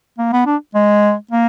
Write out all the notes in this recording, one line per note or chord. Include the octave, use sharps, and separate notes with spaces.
A#3
B3
D4
G#3
A#3